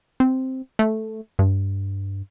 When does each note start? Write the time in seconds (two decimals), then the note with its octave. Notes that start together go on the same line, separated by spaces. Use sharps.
0.20 C4
0.79 A3
1.39 G2